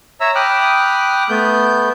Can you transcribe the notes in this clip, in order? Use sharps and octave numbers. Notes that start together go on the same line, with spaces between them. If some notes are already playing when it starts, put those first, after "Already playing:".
C#5 E5 A#5 E6
G5 B5 D6 D#6 F6 F#6
A3 B3 G6